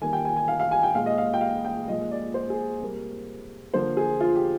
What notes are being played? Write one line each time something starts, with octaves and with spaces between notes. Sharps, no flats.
D#3 G3 A#3 G#5
G5
G#5
G#5
F5
F5
G#5
G5
A#2 G#3 F5
D#5
F5
G5
F5
G5
A#2 F3 G#3 D#5
D5
C5
G#4
C3 G3 A#3
D3 F3 A#3 C5
G#4
F4
G4